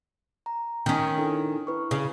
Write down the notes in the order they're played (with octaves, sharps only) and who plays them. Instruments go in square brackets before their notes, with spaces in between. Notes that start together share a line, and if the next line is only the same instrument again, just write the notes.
[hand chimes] A#5
[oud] D#3 C#4 [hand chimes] G5
[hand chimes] D4 E4 A4
E4 B4 C#6
[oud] C#3